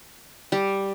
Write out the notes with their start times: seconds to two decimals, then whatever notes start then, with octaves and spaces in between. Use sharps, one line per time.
0.52 G3